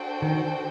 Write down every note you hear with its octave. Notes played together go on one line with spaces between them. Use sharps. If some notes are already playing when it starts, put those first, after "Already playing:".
Already playing: D4 F#4 A4 C5 G5
D#3